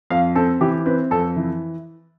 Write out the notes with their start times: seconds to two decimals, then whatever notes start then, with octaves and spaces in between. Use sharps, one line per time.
0.10 F2 F5
0.35 C4 A4
0.61 E3 G4
0.86 C4 B4
1.11 F2 A4
1.36 E3